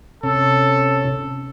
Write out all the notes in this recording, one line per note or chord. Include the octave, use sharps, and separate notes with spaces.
C3 C#4 A4